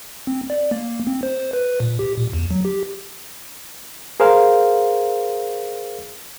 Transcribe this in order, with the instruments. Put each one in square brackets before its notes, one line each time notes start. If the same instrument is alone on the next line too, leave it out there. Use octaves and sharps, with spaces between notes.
[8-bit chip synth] C4
D5
A#3
C4
C5
B4
A#2
G4
A#2
E2
F#3
G4
[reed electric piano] G#4 A#4 C5 F5